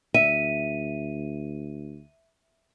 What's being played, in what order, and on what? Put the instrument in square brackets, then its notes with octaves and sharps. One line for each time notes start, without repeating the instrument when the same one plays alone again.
[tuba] D2 [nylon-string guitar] E5 [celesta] D#7